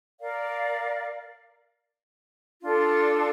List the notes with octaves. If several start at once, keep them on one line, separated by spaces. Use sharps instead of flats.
A#4 D5 F5
D4 F4 A4